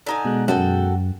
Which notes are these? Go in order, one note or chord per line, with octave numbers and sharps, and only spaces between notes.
D3 D#4 G#5
B2 G#3 F#6
F#2 F#4 A4 G5